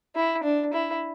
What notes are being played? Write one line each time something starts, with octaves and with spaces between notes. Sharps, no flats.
E4
D4
E4